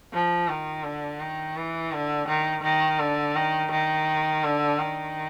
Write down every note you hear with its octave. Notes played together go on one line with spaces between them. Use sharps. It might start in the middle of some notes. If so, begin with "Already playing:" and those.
F3
D#3
D3
D#3
E3
D3
D#3
D#3
D3
D#3
D#3
D3
D#3